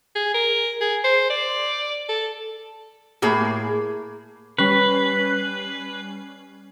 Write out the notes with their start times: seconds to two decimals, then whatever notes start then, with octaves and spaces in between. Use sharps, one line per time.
0.15 G#4
0.34 A#4
0.81 G#4
1.04 C5
1.30 D5
2.09 A4
3.22 A2 A#3 G#4
4.58 G3 C#4 B4 C7